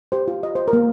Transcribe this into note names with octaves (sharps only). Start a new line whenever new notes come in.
G4 C5
F4
D#5
C5
A#4
A#3